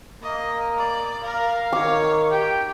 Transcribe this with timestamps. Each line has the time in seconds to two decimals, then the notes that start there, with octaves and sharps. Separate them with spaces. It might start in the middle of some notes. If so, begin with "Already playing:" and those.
0.22 A#3 D#5
0.78 D5
1.24 A#4 F5
1.73 D#3 C#5 D6
2.32 G4 G5